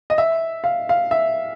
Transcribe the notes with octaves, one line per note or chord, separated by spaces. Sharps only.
D#5
E5
F5
F5
E5